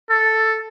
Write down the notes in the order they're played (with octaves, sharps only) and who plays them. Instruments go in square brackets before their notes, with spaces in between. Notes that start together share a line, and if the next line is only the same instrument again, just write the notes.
[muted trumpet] A4